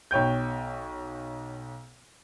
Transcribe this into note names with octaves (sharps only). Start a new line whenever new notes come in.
B1 C#5 G5 G6